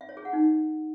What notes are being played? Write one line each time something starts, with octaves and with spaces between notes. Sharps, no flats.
E5
C#5
G#4
F#5
D#4